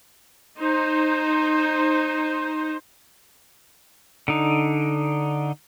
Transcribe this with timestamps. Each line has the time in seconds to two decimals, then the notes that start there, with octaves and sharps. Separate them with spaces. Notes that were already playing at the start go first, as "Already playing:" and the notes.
0.59 D#4 C5
4.28 D3 D#4